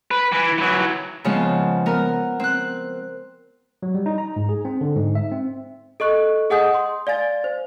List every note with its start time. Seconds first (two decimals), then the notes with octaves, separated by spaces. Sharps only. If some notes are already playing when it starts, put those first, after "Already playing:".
0.11 B4
0.32 E3
0.58 E3 F#3
1.24 C#3 F3 G#3 B3 C4
1.86 B3 A#4
2.40 C4 F#6
3.83 F#3
3.94 G3
4.06 D#4
4.18 A#5
4.36 G#2
4.49 G#4
4.65 C4
4.81 D3
4.96 G#2
5.15 E5
5.32 C4
6.00 A4 D#5 C#6 F#6
6.50 G#4 D#5 F#5 G#5 D#6 G6
6.74 C6
7.07 D5 F5 G#5 A6
7.44 C5